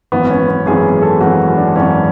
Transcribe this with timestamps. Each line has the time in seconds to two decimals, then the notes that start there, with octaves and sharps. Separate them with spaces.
0.12 G#1 F#2 E3 B3
0.30 C#4
0.48 B3
0.66 G#1 F#2 E3 G#4
1.02 A4
1.20 G#1 F#2 E3 F#4
1.57 D4
1.76 G#1 F#2 E3 C#4